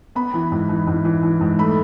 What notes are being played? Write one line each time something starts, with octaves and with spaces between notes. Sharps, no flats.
B3 B5
E3
G#2
E3
G#2
E3
E3
G#2
A3 B5